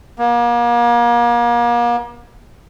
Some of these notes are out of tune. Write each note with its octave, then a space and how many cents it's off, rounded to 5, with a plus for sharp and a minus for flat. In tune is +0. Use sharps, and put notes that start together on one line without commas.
A#3 +35